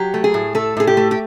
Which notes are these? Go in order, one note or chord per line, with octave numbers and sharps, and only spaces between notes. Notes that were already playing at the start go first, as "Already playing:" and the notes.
Already playing: F#3 G4
A3
G#4
A2
A3 A4
A2 G#4
G4
A3
G4